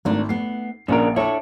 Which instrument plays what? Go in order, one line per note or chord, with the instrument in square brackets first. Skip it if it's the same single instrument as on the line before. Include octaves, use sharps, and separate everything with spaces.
[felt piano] G#1 [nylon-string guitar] A3 D4 A#4
[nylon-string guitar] A3 B3 [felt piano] C7
[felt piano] A#1 A#3 D7 [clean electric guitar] C#3 D4 A#4 [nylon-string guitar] C#5
[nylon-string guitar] D4 C#5 [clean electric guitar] E4 A4